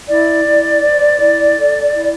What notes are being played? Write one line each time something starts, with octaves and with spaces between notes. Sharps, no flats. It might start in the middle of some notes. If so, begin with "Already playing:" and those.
E4 D5
E4
C5
E4
A4
E4